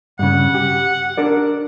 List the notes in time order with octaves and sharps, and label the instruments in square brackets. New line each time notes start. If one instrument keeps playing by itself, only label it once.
[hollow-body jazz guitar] G2 C#3 [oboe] F#5
[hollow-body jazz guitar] G4
D4 A#4 D5